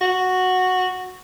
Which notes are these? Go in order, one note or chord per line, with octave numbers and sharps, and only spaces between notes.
F#4